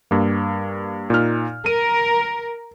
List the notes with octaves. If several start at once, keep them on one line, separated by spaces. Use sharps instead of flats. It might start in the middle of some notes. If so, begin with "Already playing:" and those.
G2 A#3
A#2 D#4 F6
A#4 D#7